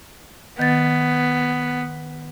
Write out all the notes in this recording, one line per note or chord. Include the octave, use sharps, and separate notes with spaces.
D#3 B3 A6